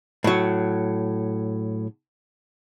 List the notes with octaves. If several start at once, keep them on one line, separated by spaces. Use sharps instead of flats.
A2 F#3